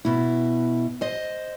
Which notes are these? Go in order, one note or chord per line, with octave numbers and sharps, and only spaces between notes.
B2 E4
C5 D#5